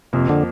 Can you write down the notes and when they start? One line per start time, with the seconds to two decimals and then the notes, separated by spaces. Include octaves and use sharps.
0.13 F2 C3 F3 A#3
0.29 D3